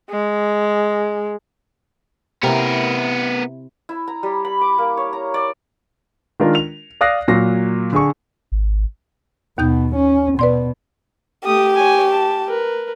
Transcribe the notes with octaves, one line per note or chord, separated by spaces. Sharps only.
G#3
C3 B3 E4 A#4
E4
A#5
G3
B5
D6
A#3
C#5
A#5
D5
D#3 G#3 D4 F4 A#4
F7
D5 F5 D#6 F#6 A#6 C7
A#2 F#3 A#6 C7
D3 G#4 C#6
G#1
D#2 B2 D#4 G6
C#4
B2 B4 D5 C6
A3 G4 D#6
C#5 G#5
A5
A#4 B4